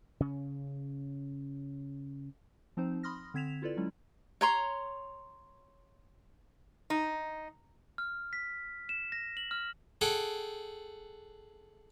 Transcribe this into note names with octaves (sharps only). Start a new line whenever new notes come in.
C#3 C#4
F3 C4 D#4 C5
B5 C6 D#6 F6 A#6
D3 C4 G#6 B6 E7 F7
E4 F4 A4 B4 D5
F#3 G#3 C#4 E4
C#5 A#5 C6
D#4
F6
B6
E7
A#6
F#7
F6
G#4 A4 F#5 G5